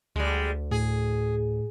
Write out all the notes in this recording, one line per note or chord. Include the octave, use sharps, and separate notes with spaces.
D2 G3 G#3
A2 G#4